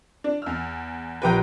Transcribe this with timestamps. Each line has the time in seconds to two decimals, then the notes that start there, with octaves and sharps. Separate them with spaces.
0.24 D4
0.42 E2 E6 F6
1.22 A#1 G4 B4 G5 A#5 D#7